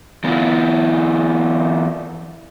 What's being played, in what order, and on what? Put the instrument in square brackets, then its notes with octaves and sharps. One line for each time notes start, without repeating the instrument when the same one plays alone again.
[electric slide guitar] E3 B3 C#4 E4 F4